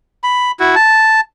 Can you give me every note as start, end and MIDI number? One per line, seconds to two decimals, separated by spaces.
0.24 0.51 83
0.60 0.75 64
0.60 0.75 66
0.75 1.21 81